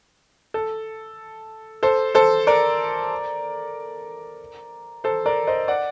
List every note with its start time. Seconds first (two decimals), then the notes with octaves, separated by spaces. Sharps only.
0.54 A4
1.83 A4 C5
2.15 A4 C5
2.47 A#4 D5
5.04 A4 C5
5.26 A#4 D5
5.47 C5 D#5
5.68 D5 F#5